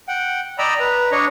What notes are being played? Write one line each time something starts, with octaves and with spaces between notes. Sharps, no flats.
F#5 G5
D5 D#5 G5 A#5 B5 E6
B4 A#5
D4 C#5 D#5 C#6